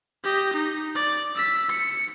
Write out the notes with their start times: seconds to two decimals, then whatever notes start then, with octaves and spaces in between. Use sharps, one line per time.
0.24 G4 D#5
0.54 D#4
0.95 D5
1.35 E6 B6
1.70 C#7